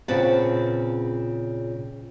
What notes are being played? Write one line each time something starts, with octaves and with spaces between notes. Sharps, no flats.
A#2 C#3 C4 B4 F#5 A5